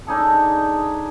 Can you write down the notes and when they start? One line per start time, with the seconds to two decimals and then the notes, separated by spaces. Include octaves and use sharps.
0.07 D4 D#4 G#4 A4